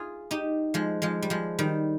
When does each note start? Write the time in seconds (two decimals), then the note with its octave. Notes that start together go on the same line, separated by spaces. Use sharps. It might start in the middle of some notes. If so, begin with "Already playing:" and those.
Already playing: F4 G#4
0.31 D#4 G4
0.74 F3 G#3
1.02 F3 G#3
1.22 G3
1.30 F3 G#3
1.59 D#3 G3